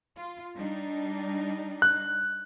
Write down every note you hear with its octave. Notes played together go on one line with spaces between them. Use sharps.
F4
G3 D4 D#4
F#6